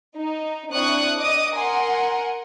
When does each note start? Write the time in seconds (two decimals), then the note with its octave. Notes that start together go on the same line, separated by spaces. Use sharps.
0.16 D#4
0.73 C4 D4 E4 C#6 D#6 F#6
1.19 D#5 D6 D#6
1.55 A#4 F#5 G#5 C6